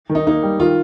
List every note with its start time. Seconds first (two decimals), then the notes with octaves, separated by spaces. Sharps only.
0.09 D#3
0.15 D#4
0.26 A#3 D#4
0.43 G3
0.60 D#3 F4